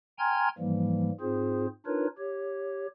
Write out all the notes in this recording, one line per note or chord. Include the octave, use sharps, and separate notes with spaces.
G5 G#5 A#5 C6 F6 G#6
G#2 E3 F3 G3 A#3
G#2 C4 F4 G#4 C5
D4 D#4 F4 A#4 B4 C#5
G4 C#5